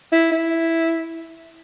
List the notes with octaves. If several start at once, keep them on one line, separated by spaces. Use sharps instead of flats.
E4
E4